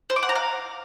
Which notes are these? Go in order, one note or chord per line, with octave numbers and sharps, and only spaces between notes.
C5
D6
F#5
A#5
F5